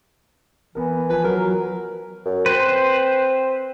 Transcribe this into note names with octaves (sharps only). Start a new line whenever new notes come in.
E3 B3 A#4
F3 B4 G#5
F#3 A#4
F#2
C4 B4 C5